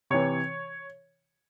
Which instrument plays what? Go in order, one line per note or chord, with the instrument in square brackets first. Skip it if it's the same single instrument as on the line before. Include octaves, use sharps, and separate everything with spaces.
[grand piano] C3 E3 C#5